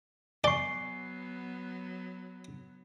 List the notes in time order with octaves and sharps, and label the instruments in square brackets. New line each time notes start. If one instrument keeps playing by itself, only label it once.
[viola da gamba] F#3 B3 [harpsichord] D5 [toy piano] G#5 C#6 [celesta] C7 G7